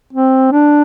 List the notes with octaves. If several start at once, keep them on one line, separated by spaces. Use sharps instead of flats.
C4
D4